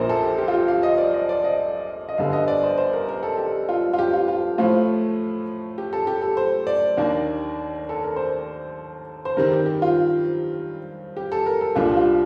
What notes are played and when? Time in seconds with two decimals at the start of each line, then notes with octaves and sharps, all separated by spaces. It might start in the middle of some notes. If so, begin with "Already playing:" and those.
Already playing: A#1 A#2 F3 A#4 C5
0.09 A4
0.23 G4
0.38 G4
0.48 F4
0.54 G4
0.68 F5
0.83 D#5
0.98 D5
1.14 D#5
1.29 D5
1.44 D#5
2.09 D#5
2.18 G1 G2 D3 F5
2.33 D#5
2.48 D5
2.63 C5
2.78 C5
2.93 A#4
3.09 A#4
3.23 A4
3.38 G4
3.69 F4
3.93 F4
3.99 G4
4.13 F4
4.28 F4
4.58 A2 F3 A3 F4
5.78 G4
5.93 A4
6.07 G4
6.22 A4
6.37 C5
6.67 D5
6.97 D#2 D#3 A#3 D4
7.89 A4
8.04 A#4
8.16 C5
9.25 C5
9.37 G2 D#3 G3 C4 A#4
9.52 G4
9.66 G4
9.82 F4
11.17 G4
11.32 A4
11.46 A#4
11.61 A4
11.75 C2 A#2 G3 D4 F4
11.87 G4
11.97 F4